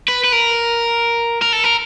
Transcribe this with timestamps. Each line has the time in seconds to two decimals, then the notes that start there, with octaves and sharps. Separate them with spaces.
0.08 B4
0.24 B4
0.32 A#4
1.42 A#4
1.53 A4
1.64 A#4